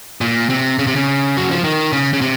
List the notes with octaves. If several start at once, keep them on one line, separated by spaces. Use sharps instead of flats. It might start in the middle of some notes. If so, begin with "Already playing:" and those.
A#2
C3
C#3
C3
C#3
F#3
F3
D#3
C#3
C#3
C3